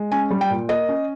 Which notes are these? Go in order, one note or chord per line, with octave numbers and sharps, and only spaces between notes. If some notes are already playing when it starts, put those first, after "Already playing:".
Already playing: G#3
C#4 G#5
G3
G5
A#2
A#3 D#5
C#4